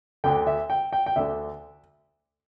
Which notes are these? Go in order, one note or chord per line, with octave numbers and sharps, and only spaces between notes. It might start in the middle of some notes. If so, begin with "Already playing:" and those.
D2 D3 G5
E5
G5
G5
G5
D2 D3 E5